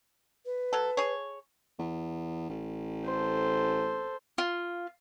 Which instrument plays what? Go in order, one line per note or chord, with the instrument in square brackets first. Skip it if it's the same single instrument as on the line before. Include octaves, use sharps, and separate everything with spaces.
[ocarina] B4
[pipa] F#3 A4
G#4 C#5
[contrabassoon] E2
A1
[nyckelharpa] A4 C5
[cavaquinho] F4